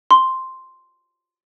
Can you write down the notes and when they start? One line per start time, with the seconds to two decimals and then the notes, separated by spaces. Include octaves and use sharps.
0.11 C6